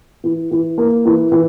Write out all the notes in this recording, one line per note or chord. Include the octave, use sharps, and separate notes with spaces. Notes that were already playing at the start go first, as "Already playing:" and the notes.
E3
E3
A#3
E3
E3